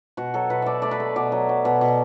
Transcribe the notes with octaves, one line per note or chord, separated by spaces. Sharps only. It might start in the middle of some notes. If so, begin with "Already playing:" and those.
B2 F#4
F#3 A4
B2 B4
B2 D5 E5
A3 D5
B4
A3
B2 D5
F#3
F#3
B2
B2